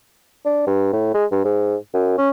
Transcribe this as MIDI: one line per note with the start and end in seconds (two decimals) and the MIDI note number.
0.45 0.63 62
0.67 0.88 43
0.93 1.10 45
1.14 1.25 56
1.32 1.44 43
1.45 1.75 44
1.94 2.15 42
2.18 2.30 61